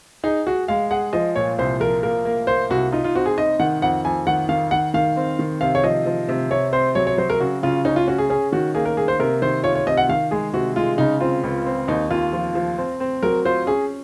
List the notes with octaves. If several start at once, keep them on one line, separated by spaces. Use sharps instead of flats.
D#4 G#4
F#4 G#4
G#3 F5
G#4 F#5
F3 D#5
A#2 C#5
C2 C5
F3 A#4
A#3 A#4
A#3
A#3 C5
C2 F#4
D#4 F4
F4
C4 F#4
G#4
D#4 D#5
D#3 F#5
F2 F#5
F2 G#5
D#3 F#5
D#3 F5
D#3 F#5
D#3 F5
C4
D#3
C3 F5
C#5
F3 D#5
F3
C3
C3 C#5
C4 C5
F#3 C#5
C#5
F#3 C5
A#4
C#3 F#4
C#3 F4
C#4 D#4
F4
C#4 F#4
G#4
C#4 G#4
D#3 F#4
A#3 G#4
A#4
A#3 G#4
C5
C3 A#4
D#3 C5
F4 C#5
C#5
C3 D#5
F#5
D#3 F5
G#3 G#4
C3 F#4
G#3 F4
C#3 D#4
C4 F4
C#2
C4
D#2 D#4
D#2 F4
F3
F3
C4
C4
F#3 A#4
F4 C5
C#4 G#4